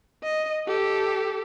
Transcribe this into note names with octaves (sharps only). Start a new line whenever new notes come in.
D#5
G4 A4